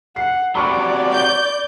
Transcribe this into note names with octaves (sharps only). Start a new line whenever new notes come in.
F#5 C7
C3 F#3 D5 B5 C#6
G6